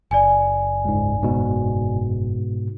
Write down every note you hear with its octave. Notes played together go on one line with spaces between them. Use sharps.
F#1 D5 G#5
C#2 G#2
G#2 B2